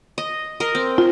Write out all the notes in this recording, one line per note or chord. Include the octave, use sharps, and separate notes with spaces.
D#5
A#4 D#5
C4
F4